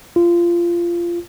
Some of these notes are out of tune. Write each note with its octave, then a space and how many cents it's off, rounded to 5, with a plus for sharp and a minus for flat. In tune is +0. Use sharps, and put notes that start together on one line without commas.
F4 -20